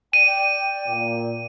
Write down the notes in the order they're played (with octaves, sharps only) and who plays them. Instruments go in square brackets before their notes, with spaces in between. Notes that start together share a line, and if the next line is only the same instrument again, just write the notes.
[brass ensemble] D5 G5 [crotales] D#7
[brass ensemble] A#2